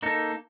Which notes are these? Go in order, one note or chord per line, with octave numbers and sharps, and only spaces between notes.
A#3 D#4 A4